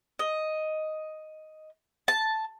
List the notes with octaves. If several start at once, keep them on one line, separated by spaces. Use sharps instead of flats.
D#5
A5